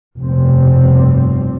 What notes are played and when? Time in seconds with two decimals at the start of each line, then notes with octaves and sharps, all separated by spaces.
0.19 F1 G2 B2 G3 C4